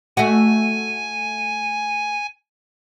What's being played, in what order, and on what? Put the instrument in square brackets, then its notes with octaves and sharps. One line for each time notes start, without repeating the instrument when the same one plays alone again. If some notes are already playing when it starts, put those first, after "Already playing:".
[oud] A3 F#4 [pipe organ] G#5